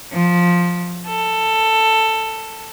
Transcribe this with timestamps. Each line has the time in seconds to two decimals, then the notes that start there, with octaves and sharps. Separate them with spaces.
0.12 F3
1.06 A4